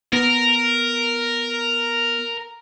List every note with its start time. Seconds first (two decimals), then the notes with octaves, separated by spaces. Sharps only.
0.13 B3 A#4